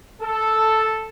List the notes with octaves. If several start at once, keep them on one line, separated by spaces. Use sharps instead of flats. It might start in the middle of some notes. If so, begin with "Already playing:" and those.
A4